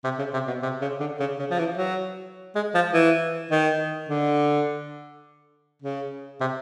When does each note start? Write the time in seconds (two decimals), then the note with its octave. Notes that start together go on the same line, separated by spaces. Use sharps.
0.04 C3
0.19 C#3
0.34 C3
0.48 B2
0.63 C3
0.82 C#3
1.00 D3
1.20 C#3
1.39 C#3
1.51 F3
1.59 E3
1.78 F#3
2.55 G#3
2.75 F3
2.93 E3
3.51 D#3
4.09 D3
5.83 C#3
6.41 C3